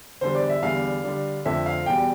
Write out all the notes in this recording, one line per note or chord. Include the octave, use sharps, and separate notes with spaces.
E2 D3 G3 C5
D5
E5
E2 D3 G3 F5
D3 G3 D4
F2 D3 A3 C4 E5
F5
E2 B2 G3 G5